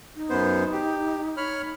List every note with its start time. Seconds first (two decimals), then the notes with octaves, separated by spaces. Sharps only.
0.16 D#4
0.30 F#2 B3 C5
0.72 G4
1.37 C#5 B5 F6